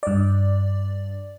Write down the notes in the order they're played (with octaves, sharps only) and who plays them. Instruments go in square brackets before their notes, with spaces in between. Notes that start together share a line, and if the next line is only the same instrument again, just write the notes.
[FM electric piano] G2 D5